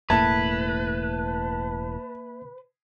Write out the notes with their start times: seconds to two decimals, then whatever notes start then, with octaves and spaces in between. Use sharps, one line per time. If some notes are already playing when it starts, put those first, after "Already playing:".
0.10 E1 A2 A#3 B4 E5 A5 G#6